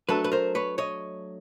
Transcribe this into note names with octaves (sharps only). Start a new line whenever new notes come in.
F#3 A3 D4 A4 B4
B4
A#4 C5
B4 C#5
C#5 D#5